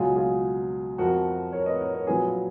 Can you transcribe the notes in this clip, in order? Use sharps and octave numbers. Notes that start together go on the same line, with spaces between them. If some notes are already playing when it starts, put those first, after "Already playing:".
Already playing: C#2 B2 F#3 F4 G#4
F4 G#4
F2 F3 F#4 A#4
A#4 C#5
B4 D#5
A#4 C#5
A#4 C#5
A#1 A#2 F#3 G#4 B4
F4 G#4